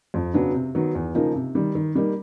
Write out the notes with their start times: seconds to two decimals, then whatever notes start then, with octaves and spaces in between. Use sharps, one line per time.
0.14 F2
0.34 C#3 F#3 B3 D4
0.54 C3
0.75 D#3 F#3 B3
0.95 E2
1.15 C#3 F3 A#3 D#4
1.35 C3
1.55 D#3 G3
1.75 D#3
1.95 G3 A#3 D#4